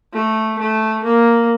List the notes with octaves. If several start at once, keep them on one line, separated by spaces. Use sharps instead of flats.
A3
A3
A#3